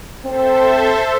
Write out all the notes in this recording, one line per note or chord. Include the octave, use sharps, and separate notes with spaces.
C4 A4 C5 E5